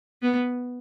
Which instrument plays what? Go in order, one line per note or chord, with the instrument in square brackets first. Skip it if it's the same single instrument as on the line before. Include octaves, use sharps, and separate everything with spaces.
[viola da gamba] B3